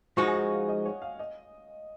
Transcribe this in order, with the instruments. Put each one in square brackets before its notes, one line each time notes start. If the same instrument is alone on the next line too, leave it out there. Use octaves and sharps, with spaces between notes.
[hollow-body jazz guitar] F3 G#3 D#4 F#4 [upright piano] C#6
[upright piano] G#5
F#5
F5
D#5
C#5
F5
D#5